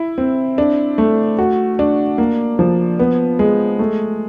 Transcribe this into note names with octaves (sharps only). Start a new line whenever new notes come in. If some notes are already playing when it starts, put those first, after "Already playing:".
Already playing: E4
C4
D4
A3
F#4
D4
A#3
F3
B3
G#3
A3